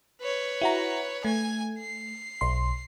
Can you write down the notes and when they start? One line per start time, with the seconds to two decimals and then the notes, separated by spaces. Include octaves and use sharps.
0.21 B4 C#5
0.61 E4 F#4 A#5
1.25 A3 G#5
1.80 C7
2.41 B1 C6